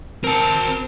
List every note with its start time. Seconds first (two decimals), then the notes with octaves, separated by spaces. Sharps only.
0.24 C4 A#4 A5